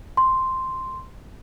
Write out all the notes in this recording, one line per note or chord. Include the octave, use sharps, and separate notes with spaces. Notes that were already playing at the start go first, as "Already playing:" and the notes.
C6